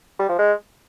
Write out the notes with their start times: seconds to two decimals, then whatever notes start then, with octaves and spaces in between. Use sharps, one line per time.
0.19 G3
0.29 F3
0.39 G#3